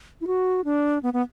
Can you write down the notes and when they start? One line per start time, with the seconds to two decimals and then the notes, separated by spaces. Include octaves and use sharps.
0.21 E4
0.27 F#4
0.65 D4
1.03 B3
1.13 B3